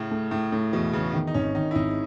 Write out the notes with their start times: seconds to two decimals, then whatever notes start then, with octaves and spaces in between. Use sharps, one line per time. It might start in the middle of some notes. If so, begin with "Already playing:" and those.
Already playing: A2 C#3
0.11 A3
0.31 A2 A3
0.52 A2 A3
0.73 E2 B2
0.93 E2 C#3
1.14 D#3
1.27 D#4
1.34 G#1 C#4
1.55 D#3 D#4
1.71 E4
1.75 G#1 D#4